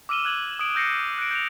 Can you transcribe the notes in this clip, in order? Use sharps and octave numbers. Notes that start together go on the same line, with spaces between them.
D6 E6 F6 D#7 E7 G7
F#6 G#6 F#7
D#6 D7
E6 G6 A#6 C7 C#7
F#6 D7
G6 D7 F7